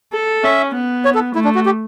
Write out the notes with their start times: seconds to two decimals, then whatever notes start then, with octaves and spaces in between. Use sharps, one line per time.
0.13 A4
0.44 C#4 E5
0.74 B3
1.05 C#5
1.15 A4
1.35 A3 E4
1.45 D4
1.55 F#4
1.66 G4